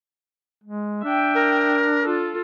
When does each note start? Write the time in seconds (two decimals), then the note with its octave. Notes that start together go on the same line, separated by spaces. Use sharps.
0.64 G#3
1.04 D4 E5 G5
1.35 A#4
2.04 F4 A4